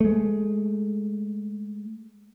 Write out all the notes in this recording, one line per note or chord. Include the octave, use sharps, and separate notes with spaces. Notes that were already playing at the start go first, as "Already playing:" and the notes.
G#3 A3